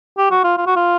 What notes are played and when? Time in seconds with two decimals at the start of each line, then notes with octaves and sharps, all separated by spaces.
0.18 G4
0.31 F#4
0.44 F4
0.57 F4
0.67 F#4
0.76 F4